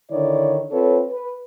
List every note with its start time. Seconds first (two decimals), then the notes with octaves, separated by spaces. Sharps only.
0.12 D3 D#3 E4 C#5 D5
0.72 C4 F4 A4 B4 C#5
1.11 B4